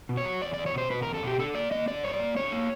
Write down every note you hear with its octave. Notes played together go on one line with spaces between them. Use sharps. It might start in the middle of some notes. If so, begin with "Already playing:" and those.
B2
C#5
F#3
E2 D5
E2 D5
C#5
B2 C5
B2 B4
E2 A#4
A4
B2 G4
D3 A4
A#3 D5
A#3 D#5
D3 D5
G2 C#5
D5
A#3
D3 C#5
A#3